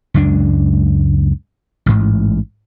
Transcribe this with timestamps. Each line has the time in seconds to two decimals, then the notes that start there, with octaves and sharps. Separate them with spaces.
0.14 C#2 F#2 G#3 D4
1.86 A1 G#2